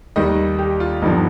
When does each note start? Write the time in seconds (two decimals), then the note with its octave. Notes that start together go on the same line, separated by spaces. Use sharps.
0.16 D#2 D#3 G3 D#5
0.59 G4
0.80 F4
1.02 G1 G2 F3 D#4